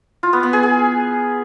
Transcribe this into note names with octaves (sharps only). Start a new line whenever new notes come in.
F4
B3
B3
G#4
G#4